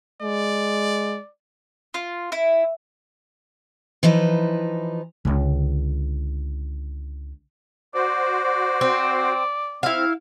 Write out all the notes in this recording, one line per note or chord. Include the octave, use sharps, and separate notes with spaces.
G#3 D5
F4
E4
E3 F3 D#4 B4
C#2 D3
F#4 C5 D5
D5
C4
C4 E4 F5